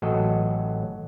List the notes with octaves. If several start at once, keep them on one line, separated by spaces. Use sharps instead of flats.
A1 F#3 A4 D#5